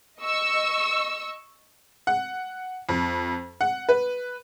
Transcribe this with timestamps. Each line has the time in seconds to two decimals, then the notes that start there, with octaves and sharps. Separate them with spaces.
0.20 D#5 C#6 E6
2.07 F#5
2.89 F2
3.61 F#5
3.89 B4